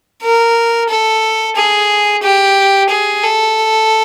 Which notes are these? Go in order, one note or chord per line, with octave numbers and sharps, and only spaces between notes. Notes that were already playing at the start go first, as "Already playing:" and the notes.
A#4
A4
G#4
G4
G#4
A4